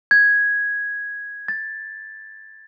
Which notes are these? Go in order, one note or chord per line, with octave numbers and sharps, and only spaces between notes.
G#6
A6